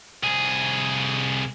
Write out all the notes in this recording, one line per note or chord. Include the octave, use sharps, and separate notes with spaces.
C2 G#4